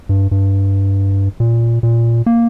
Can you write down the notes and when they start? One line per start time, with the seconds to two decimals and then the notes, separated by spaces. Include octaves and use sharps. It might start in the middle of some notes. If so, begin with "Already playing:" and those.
0.09 G2
0.31 G2
1.40 A#2
1.83 A#2
2.26 A#3